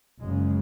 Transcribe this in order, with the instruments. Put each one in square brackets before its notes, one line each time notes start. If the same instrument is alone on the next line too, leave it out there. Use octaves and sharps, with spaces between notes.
[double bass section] F#1 F#2 C#3 G#3